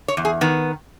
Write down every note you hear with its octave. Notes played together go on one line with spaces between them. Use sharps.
C#5
E2
G#4
D#3 B3